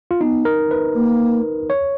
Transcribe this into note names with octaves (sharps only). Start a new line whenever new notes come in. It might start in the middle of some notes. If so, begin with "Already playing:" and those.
F4
B3 D#4
A#4
B4
A#3
C#5